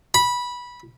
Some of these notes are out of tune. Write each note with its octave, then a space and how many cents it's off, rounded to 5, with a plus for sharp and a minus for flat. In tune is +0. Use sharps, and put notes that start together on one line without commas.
B5 -15